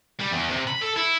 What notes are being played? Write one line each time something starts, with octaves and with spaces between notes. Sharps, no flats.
G3
E2
C3
B5
A4
E4